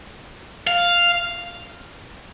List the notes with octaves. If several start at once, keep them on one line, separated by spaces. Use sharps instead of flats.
F5